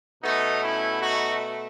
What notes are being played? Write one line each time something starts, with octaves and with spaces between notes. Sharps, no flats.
B2 A3 B3 D#4
C#4 E4
D#4 F#4